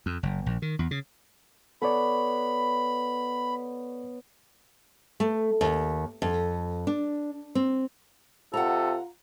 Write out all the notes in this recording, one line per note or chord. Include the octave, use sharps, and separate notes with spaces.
F2
F#1
A#1
D#3
E2
C#3
B3 A4 C#5 D5 B5
A3
D#2
F2
D4
C4
C3 F4 A4 F#5 A#5